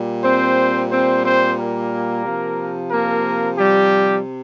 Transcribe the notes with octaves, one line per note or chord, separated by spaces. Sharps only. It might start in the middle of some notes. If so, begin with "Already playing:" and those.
Already playing: A#2 G3
C4 C5
C4 C5
C4 C5
A#3 A#4
C3 F3
A#3 A#4
G3 G4